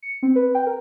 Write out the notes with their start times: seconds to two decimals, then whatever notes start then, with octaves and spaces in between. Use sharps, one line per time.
0.02 C#7
0.23 C4
0.36 B4
0.55 G5
0.67 A#4